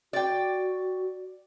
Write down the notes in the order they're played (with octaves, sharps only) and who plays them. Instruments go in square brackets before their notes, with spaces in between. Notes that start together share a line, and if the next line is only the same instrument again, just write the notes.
[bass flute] F#4 [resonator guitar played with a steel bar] D5 G5